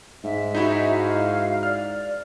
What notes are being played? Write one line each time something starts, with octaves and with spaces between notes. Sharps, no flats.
G#2 E5
D#4 E4 F#4
F5
D5 F6